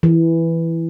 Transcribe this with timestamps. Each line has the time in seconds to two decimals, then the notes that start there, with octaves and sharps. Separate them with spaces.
0.03 E3